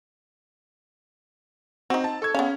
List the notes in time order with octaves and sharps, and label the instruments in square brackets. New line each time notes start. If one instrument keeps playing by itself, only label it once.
[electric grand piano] C4 [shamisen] D#4 F#4
[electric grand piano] A5
A4 C#6 G#6
[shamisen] B3 G#4 F5 [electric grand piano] C#4